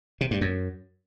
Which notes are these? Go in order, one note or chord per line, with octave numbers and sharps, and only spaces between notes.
C3
G2
F#2